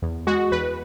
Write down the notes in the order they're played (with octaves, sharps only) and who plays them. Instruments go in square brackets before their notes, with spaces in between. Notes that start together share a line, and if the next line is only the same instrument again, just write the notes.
[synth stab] E2
G#3 F#4
E2 B4